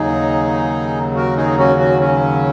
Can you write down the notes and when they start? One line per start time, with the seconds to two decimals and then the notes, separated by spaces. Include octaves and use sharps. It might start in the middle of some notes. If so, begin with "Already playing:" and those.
Already playing: D#2 C#3 F#3 D#4 G#4
1.16 F#4 A#4
1.37 D#4 G#4
1.58 C#4 F#4
1.79 C#4 F#4
2.00 C#4